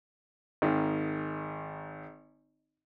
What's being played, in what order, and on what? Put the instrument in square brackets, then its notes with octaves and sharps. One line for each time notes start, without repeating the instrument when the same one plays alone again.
[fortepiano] G#1 D#3